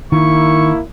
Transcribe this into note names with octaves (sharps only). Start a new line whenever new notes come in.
D#3 A#3 E4 C#6